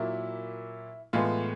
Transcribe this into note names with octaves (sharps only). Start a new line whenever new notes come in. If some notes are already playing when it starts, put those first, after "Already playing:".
Already playing: A#2 F#3 A#3 E4
A2 E3 G#3 B3 F4